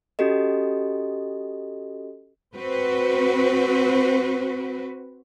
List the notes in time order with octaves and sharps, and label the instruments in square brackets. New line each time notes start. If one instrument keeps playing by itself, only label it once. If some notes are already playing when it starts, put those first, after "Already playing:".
[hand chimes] C#4 F#4 G4 A4 D#5
[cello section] C4 F#4 B4